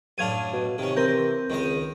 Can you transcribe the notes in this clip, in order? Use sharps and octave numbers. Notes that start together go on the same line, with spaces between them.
F#2 A2 D4 F5 G#6 D#7
B2
C3 D#3 C#4
E3 C4 A#4 G6
C#2 D#3 G#3 D#5